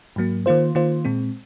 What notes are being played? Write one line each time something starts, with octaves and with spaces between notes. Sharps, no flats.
G#2 F#3 A#3
D#3 A#3 F4 C5
D#3 A#3 F4 C5
A#2 G#3 C4